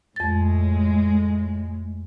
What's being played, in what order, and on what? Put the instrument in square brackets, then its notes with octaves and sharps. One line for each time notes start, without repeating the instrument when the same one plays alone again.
[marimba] F2 A6 [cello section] A2 G#3